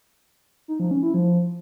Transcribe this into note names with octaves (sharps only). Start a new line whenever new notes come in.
D#4
F3
C#4
E4
F3